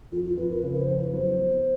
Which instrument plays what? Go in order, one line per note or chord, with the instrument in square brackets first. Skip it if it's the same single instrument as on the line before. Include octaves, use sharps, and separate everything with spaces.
[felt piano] F2 [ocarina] F4
[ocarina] F4
[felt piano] F2 [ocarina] B4
[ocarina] A#4
[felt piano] C#3 [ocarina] B4
[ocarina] C5
[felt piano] F2
[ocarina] B4
[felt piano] F#3 [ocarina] C5
[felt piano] B3